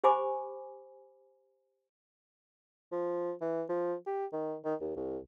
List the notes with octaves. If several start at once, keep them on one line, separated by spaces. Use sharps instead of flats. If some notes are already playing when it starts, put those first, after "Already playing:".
G4 C5 G#5 B5 D6
F3
E3
F3
G4
D#3
D#3
D#2
C2